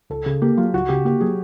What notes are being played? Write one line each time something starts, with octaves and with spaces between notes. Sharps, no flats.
C#2 A4
C#3 G#4
A#3 G4
F#3 F4
C#2 F#4
C#3 G4
A#3 G4
F#3 G#4